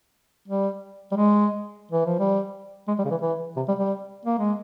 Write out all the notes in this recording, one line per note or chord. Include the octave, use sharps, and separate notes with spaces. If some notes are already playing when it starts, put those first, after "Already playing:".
G3
G3
G#3
E3
F3
G3
G#3
G3
C#3
E3
E3
C3
G3
G3
A#3
G#3